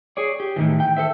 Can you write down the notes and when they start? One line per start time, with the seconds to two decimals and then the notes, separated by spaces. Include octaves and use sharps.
0.17 G#4 C#5 D5
0.40 G4
0.56 A2 D#3 E3
0.80 G5
0.97 A4 C5 E5